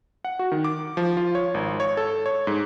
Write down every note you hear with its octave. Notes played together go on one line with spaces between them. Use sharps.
F#5
F#4
D#3
D6
F3
F4
C#5
G#1
C#5
A4
C#5
G#2